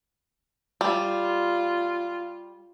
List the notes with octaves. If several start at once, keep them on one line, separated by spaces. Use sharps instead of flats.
G3 F4